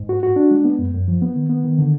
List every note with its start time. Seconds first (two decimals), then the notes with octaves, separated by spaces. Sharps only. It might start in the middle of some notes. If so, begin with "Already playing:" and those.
Already playing: G#2
0.09 F#4
0.23 F#4
0.36 D4
0.51 G#3
0.65 B3
0.79 F#2
0.94 F#2
1.08 F3
1.22 B3
1.36 D#3
1.49 B3
1.64 D#3
1.78 D3